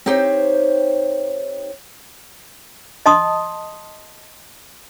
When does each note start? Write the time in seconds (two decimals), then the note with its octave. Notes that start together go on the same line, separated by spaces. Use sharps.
0.06 C4 D#4 G4 C5 C#5
3.06 D#5 A5 C6 D#6